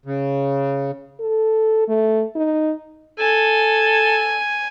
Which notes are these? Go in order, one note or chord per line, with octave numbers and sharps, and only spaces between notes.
C#3
A4
A3
D#4
A4 G#5